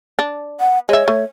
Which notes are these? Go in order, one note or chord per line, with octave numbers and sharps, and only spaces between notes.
D4
F#5
G#3 C#5 E5
A3